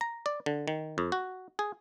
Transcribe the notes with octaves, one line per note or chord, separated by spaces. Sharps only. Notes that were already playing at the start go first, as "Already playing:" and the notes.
A#5
D5
D3
D#3
F2
F#4
G#4